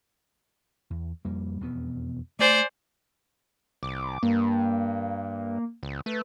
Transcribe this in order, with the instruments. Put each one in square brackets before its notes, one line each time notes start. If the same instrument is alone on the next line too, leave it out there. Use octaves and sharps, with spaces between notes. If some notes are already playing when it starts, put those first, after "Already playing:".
[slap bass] E2
F2 G3 A#3
E1 F2 B3
[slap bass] A3 [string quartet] C5 D5 G#5
[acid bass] C2 [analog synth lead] D6
[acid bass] G2 [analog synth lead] A#3
[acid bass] C#2
[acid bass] A3 [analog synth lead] B4